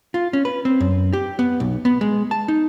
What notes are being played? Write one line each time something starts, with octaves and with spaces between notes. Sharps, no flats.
F4
C#4
B4
C4
F#2
G4
B3
B1
B3
G#3
A5
D#4